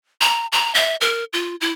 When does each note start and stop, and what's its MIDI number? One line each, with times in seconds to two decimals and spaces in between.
0.21 0.47 82
0.52 0.73 82
0.75 0.96 76
1.01 1.24 70
1.33 1.56 65
1.61 1.72 64